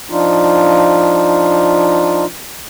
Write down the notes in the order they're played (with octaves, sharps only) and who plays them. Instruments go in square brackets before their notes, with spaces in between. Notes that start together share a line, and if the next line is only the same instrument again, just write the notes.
[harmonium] F3 D4 D#4 F4